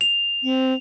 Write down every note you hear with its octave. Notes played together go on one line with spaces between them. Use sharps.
F7
C4